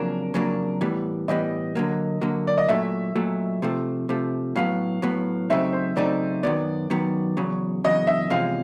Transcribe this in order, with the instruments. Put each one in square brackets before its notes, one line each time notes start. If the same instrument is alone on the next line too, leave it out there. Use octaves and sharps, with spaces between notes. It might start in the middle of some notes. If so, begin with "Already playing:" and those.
Already playing: [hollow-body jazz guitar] F2 C#3 F#3 A#3 D4 [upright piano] A#4
[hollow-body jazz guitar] F2 C#3 F#3 A#3 D4
A2 E3 G3 B3
[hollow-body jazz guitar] A2 E3 G3 B3 [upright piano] D#5
[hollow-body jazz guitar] D3 F#3 A#3
D3 F#3 A#3
[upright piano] D5
D#5
[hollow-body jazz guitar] A#2 F#3 A3 [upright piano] E5
[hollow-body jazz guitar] A#2 F#3 A3
C3 F3 A3
C3 F3 A3
[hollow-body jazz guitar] A2 F#3 B3 [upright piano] F5
[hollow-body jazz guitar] A2 F#3 B3
[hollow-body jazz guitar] C#3 F#3 A3 C4 D#4 [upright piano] E5
[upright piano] C5
[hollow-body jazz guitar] C#3 F#3 A3 C4 D#4 [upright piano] D5
[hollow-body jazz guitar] F#2 D#3 F#3 B3 [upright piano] D5
[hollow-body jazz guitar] F#2 D#3 F#3 B3
E2 C#3 F#3
[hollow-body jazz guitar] E2 C#3 F#3 [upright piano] D#5
[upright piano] E5
[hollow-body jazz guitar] E2 C3 F3 G#3 C#4 [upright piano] F5